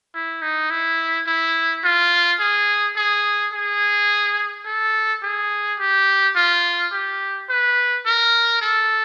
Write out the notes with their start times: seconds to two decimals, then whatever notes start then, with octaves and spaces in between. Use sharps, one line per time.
0.14 E4
0.42 D#4
0.70 E4
1.27 E4
1.84 F4
2.40 G#4
2.97 G#4
3.53 G#4
4.66 A4
5.23 G#4
5.79 G4
6.36 F4
6.93 G4
7.49 B4
8.06 A#4
8.62 A4